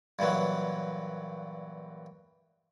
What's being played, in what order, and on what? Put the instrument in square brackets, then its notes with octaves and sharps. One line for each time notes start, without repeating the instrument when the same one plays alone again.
[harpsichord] G2 A#2 E3 F#3